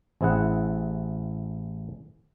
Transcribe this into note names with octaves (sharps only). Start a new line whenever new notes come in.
A1 C4 E4 G#4 F#5